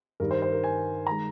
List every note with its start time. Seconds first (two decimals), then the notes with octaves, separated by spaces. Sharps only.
0.20 G2 D#3 G3 A#4
0.31 C5
0.42 C5
0.52 A#4
0.64 G#5
1.07 D#3 G#3 A#5